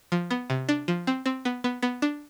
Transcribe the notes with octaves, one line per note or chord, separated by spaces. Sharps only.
F3
B3
C3
D4
F3
C4
C4
B3
B3
B3
D4